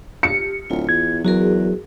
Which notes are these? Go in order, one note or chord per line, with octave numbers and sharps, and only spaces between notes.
G4 C#7
D1 F4
E2 G#6
E2 F#3 F#4 G#4 A#4